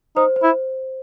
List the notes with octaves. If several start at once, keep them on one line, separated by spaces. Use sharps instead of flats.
D#4 C5
C5
E4